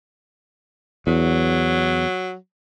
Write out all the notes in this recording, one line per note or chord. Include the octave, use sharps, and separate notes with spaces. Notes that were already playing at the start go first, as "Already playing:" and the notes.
E2 F#3